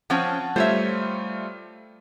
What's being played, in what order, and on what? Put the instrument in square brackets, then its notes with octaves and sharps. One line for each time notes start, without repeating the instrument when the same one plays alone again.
[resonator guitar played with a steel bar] F3 C4 C#4 [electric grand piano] F#5 A5
[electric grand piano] G3 A3 F4 [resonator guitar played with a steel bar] C5 C#5 E5